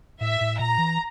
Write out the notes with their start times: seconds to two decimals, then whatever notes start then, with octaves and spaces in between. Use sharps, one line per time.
0.21 A2 E5
0.41 A2
0.59 A#2 A#5
0.78 E3